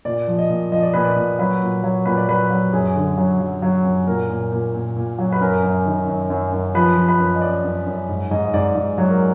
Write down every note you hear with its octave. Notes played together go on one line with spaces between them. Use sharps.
A#2 D5
F3
D#5
A#2
F3 D#5
D5
A#2 B4
D5
A#2
F#3 B4
A#2
F#3
A#2 B4
D5
F#3 B4
F#3
F#2 G#4
D3
F#3
F#3
F#3
F#2
A#2 A#4
A#2
A#2
A#2
A#2
F#3
B4
F#2 A#4
F#2
D#3
F#2
F#2
F#2
F3 B4
F3
B4
F#2
D#5
F#2 D5
F#2
F#2
G#2
G#2 D#5
D#5
G#2 D5
G#2
F#3
A#4